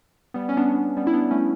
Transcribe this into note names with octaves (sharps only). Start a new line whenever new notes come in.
G3 B3
C#4
B3 D4
G3 B3
E4
B3 D4
A3 C#4